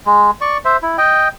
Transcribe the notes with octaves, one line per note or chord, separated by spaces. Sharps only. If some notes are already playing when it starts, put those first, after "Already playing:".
G#3
D5 C#6
C5 E5
E4
D#5 G5